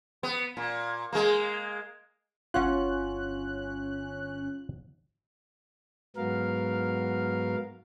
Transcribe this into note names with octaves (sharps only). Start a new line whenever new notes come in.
B3
A#2
G#3 A#3
G1 C#4 F4 C#5 F#5 F#6
G#2 F#3 B3 A#4 F5